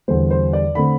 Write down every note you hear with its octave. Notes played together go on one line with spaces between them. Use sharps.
E2 D3 G3 C5
C5
D5
D3 A3 C4 B5